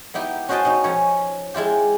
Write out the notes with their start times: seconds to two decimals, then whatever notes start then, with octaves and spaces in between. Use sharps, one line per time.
0.14 B3 D#4 E4 G4
0.49 C#4 F#4 C5 D#5 G5 A5
0.65 B2 D#4
0.84 F3 C#4 C#5
1.54 G#3 E4 F4 G4